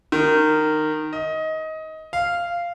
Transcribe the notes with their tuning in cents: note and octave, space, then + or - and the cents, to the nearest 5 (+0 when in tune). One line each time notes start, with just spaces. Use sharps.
D#3 -15
D#5 +20
F5 -10